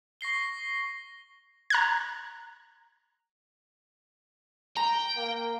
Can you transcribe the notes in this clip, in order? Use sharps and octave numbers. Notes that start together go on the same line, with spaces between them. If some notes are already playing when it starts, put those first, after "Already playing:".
C#6 A#6 C7 G7
A#5 F#6 G#6
G5 A#5
A#3